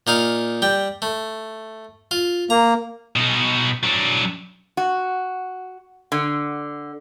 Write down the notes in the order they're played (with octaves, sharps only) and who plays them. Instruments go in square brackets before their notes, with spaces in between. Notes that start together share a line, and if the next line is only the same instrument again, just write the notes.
[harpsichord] A#2 D#4 F5
G3 G5
A3
F4
[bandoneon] A#3 [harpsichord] A#5
[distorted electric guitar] B2 D#4
F#3 D4
[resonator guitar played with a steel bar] F#4
D3